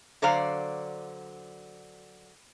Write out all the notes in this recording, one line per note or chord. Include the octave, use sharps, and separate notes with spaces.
D3 F#3 C5 D5 F5